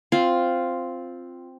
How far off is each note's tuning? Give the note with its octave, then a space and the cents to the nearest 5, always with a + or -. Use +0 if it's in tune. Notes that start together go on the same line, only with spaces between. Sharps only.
C4 +0 F4 +0